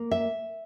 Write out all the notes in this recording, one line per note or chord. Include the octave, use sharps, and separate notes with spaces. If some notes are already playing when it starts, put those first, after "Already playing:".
Already playing: A#3
E5